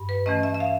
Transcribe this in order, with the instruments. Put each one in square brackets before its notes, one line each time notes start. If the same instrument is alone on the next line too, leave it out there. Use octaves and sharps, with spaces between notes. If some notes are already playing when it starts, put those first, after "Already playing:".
Already playing: [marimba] G2
B4
E3 A3 C#4 D#5
E5
E5
F5